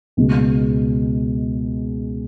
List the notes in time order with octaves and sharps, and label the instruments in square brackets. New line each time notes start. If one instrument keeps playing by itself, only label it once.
[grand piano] C#2 B2 G#3